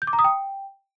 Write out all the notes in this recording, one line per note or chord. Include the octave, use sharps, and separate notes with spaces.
G6
D6
A#5
D#6
G5